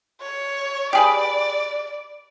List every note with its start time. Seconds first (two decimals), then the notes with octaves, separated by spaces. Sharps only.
0.21 C#5
0.93 G4 G#4 B4 D5